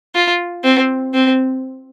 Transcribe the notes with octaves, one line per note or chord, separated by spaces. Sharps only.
F4
C4
C4